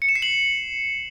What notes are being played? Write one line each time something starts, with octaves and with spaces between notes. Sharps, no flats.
C#7
E7
C7
F#7